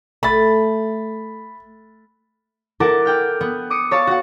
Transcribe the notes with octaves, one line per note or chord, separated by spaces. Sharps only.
A3 B5 A6
E4 A4 A#4 F#5 A5 D6
F#5 G5 F6
B3
D6 D#6 C#7
C#5 F5 A5 C#6
F#4 F#5